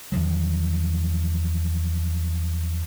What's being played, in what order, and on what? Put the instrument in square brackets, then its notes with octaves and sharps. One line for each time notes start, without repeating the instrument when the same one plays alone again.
[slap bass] E2 D#3 F3 F#3